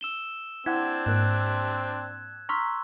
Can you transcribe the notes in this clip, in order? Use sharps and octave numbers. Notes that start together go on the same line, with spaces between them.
E6 E7 G7
C4 D4 E4 F#5 G#6
G#2 A#3 F#6
A#5 C6 C#6 E6 F6 B6